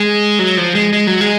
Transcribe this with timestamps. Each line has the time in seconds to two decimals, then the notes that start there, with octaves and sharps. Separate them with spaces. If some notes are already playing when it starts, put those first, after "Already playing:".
Already playing: G#3
0.39 F#3
0.57 F3
0.75 G#3
0.93 G#3
1.07 F#3
1.21 G#3